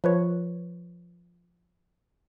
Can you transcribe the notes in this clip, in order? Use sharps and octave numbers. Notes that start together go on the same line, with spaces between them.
F3 B4 C#5